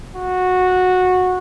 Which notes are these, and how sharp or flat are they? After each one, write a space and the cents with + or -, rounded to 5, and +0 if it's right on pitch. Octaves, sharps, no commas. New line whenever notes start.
F#4 -15